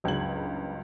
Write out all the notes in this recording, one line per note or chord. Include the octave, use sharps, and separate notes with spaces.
F#1 C#2 G2 F#3 G#6 F#7